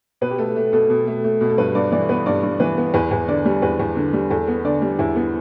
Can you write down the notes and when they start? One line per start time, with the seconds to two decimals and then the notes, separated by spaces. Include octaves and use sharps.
0.21 B2 B4
0.30 G4
0.38 A3 A4
0.56 A3
0.73 B2 A4
0.90 B2
1.07 A3
1.24 A3
1.41 B2
1.49 A4
1.58 G2 B4
1.75 G2 D5
1.92 E3 D5
2.09 B3 B4
2.26 G2 D5
2.43 G2
2.60 E3 B4
2.77 B3
2.94 E2 B4
3.11 E2
3.28 D3 D5
3.45 G3
3.62 E2 B4
3.80 E2
3.97 D3
4.13 G3
4.30 E2 A4
4.47 B3
4.64 D3 D5
4.82 G3
4.99 E2 E4
5.16 B3